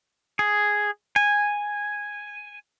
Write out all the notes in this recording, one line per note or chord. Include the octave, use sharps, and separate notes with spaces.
G#4
G#5